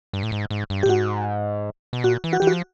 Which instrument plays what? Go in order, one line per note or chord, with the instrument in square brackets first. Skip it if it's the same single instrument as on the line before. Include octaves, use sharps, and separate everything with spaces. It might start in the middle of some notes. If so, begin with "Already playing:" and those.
[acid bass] G2
A2
G#2
G#2
G2
[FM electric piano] G4
[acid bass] A2
[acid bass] G#2 [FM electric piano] F#4
[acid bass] B2
[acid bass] A#2 [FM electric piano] F#4
[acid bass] E3
[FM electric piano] F#4
[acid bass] E3 [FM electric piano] G4
[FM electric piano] F#4
[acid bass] F3